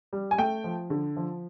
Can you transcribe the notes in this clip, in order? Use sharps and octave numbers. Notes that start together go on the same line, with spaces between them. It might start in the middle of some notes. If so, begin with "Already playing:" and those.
G3
G#5
A3 G5
F3
D3
F3